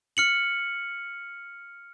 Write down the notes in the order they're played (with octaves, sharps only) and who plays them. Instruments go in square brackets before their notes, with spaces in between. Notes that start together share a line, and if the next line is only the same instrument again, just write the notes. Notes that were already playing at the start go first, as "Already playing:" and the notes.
[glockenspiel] F6 C#7 F#7